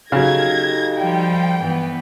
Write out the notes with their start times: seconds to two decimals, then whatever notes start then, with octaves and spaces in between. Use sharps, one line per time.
0.12 C#3 F#3 D#4 G4 A4 G#6 A#6
0.97 F3 G3 G5
1.58 G2 E3 B3